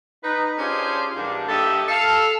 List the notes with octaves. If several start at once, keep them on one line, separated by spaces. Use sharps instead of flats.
D#4 B4
C#4 D4 F4 G4 G#4 C5
G#2 E3 G3 A#3 D4
G2 A#3 G4 A4 D#5 E5
A4 F5